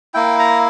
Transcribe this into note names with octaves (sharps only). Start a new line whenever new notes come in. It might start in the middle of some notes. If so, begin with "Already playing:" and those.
A#3 E4 G5
A#5